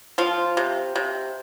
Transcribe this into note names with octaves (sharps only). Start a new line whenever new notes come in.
F3 F4
C3
C3